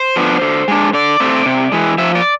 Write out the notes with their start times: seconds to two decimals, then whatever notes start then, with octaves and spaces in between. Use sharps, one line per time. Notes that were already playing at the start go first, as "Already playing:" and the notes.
Already playing: C5
0.16 F3 B3 D4
0.41 D3
0.68 G#3 D4
0.93 D3 D5
1.20 A3 C4
1.46 C3
1.72 E3 G#3
1.98 F3 E5
2.15 D5